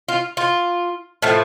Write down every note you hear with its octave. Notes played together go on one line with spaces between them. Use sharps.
F4
F4
A2 F3 A3